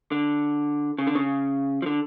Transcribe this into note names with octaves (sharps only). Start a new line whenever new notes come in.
D3
C#3
D3
C#3
F3
D3